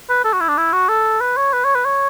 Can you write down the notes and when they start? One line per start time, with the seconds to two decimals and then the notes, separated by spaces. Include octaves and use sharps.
0.09 B4
0.24 A4
0.33 F#4
0.41 E4
0.49 D4
0.58 E4
0.73 F#4
0.89 A4
1.21 B4
1.37 C#5
1.53 B4
1.65 C#5
1.75 B4
1.85 C#5